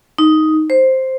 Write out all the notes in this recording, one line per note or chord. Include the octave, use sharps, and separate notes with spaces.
D#4
C5